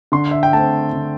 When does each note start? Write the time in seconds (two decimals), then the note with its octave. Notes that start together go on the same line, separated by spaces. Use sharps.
0.12 D3 C6
0.31 E5
0.43 G5
0.53 A3 C4 A5
0.93 D3